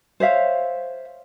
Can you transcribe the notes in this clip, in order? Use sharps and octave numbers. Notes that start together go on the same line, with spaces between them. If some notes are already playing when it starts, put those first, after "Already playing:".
C5 C#5 E5 F5